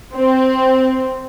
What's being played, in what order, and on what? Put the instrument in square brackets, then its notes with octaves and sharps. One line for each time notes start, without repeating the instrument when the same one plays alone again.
[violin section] C4